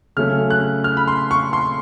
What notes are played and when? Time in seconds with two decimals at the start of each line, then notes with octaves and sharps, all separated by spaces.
0.17 C#3 F#3 A3 C#4 F6
0.50 F#6
0.84 F6
0.97 B5
1.08 C6
1.31 C#6
1.53 C6